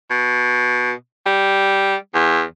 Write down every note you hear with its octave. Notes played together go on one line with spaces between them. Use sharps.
B2
G3
E2